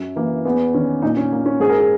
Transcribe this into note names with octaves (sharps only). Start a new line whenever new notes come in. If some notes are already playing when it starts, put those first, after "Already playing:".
Already playing: F#2
E3 A#3
E2 B3
D#3 C#4
A#2 D#4
C#4
A#3
C#4
G#2 G#4
A#4
G#4